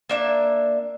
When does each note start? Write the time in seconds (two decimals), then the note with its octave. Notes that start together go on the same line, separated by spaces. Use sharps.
0.09 A#3 D4 E5